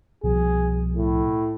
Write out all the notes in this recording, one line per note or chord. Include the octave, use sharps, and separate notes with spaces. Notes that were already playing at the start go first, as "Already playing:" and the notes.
C2 B2 F3 G#4
A2